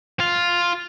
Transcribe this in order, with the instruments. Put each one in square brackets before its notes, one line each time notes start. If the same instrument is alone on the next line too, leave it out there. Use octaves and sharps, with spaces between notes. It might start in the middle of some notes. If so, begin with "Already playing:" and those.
[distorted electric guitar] F4